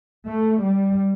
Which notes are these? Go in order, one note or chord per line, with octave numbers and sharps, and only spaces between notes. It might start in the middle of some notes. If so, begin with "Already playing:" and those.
A3
G3